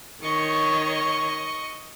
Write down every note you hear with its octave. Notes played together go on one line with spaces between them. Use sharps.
D#3 C#5 D#5 C#6